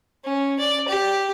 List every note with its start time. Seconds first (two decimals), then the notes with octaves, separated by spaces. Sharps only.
0.24 C#4
0.59 D5
0.88 G4